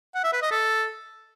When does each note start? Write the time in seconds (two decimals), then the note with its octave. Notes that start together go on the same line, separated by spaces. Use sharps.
0.15 F#5
0.24 E5
0.33 B4
0.42 D#5
0.51 A4